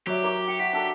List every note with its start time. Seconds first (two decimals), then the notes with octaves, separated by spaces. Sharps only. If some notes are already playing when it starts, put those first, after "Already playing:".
0.07 F#3 G4 C#5 D5 E5
0.23 A#4 C#5 D6
0.48 G5 C#7
0.60 F#4 B6
0.73 D4 A4